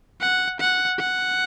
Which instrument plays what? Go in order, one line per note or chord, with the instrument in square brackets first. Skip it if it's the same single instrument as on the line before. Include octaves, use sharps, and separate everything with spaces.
[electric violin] F#5
F#5
F#5